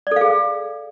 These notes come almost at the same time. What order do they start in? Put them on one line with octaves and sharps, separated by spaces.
D5 A4 F5 G#4